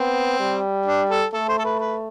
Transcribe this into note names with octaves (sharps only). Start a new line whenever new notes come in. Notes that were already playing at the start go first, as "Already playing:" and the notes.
Already playing: B3 C4
G3
D4
A4
A3 A4
C5
A4
B4
B4